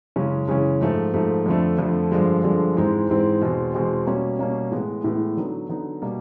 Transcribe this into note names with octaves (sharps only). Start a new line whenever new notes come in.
F#2 C#3 E3 G#3 C#4
F#2 C#3 E3 G#3 C#4
G#2 F3 A3
G#2 F3 A3
F2 D3 F3 A3
F2 D3 F3 A3
G2 D3 F3 G#3
G2 D3 F3 G#3
G#2 E3 G#3 C4
G#2 E3 G#3 C4
E2 B2 G#3 C4
E2 B2 G#3 C4
B2 G3 A#3 C#4
B2 G3 A#3 C#4
A2 E3 G#3 B3
A2 E3 G#3 B3
D3 F#3 B3 D#4
D3 F#3 B3 D#4
B2 G3 A#3